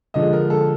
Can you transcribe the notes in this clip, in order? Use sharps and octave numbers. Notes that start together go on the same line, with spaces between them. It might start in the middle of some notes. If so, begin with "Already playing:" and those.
D3 F3 G#3 D#5
A#4
A4